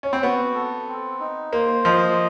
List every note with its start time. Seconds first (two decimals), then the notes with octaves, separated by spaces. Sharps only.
0.03 C#4
0.13 C4
0.23 B3 F#4
0.55 A4
0.88 C4
1.20 D#4
1.53 A#3 C5
1.85 F3 D#5